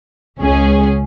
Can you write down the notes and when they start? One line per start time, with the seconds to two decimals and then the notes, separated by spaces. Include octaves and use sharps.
0.41 C#2 C#4 G#4